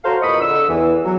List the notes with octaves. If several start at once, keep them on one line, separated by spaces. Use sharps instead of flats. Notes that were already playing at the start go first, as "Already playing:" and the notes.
F#4 A4 C5 C#5 F5 A#5
E2 A#2 D#5 B5 C#6 D#6
D3 E6
E2 E3
F#3